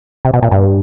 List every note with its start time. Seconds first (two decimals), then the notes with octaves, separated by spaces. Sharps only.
0.25 C3
0.33 B2
0.42 A#2
0.51 G2